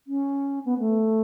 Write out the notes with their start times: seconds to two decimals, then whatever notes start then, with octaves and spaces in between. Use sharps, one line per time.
0.07 C#4
0.65 B3
0.79 A3